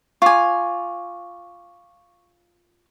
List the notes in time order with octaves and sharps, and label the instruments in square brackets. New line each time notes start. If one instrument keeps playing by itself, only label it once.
[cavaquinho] F4 G#5 [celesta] C#6 D6